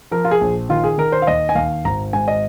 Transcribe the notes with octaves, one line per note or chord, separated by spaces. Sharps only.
F3 A#4
F4
G#4
A#1
D#3 F4
G#4
D#3 A#4
C5
F5
D#2 D#5
G#5
D#2 F5
G#1 A#5
G#2 G#5
D#5